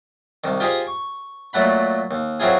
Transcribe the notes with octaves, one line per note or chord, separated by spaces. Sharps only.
C2 D#3
F4 G4 G#4 C5 D#5 F5
C#6
A#2 F#3 A3 F#5 B5
D#2
F#3 C4 E4 F4 G#4